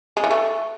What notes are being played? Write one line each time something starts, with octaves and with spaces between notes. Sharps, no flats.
G#3
E3
A3